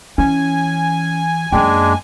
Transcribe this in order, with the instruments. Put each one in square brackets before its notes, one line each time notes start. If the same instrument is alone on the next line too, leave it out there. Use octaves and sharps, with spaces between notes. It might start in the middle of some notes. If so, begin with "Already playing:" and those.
[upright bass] E3 [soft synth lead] C#4 [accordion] G#5
[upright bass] F#2 A#3 [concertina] G#3 D4 [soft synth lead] G5